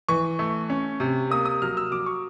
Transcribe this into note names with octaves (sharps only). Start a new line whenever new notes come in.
E3 C#6
A3
C#4
C3
A#3 D#6
D#6
F#3 F6
E6
F#3 D6
C#6